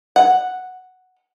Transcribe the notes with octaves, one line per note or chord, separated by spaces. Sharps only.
F#5